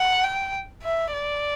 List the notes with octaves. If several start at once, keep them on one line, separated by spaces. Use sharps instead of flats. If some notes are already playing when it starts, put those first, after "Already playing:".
Already playing: F#5
G5
E5
D5